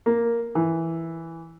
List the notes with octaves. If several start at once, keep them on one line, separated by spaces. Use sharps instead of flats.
A#3
E3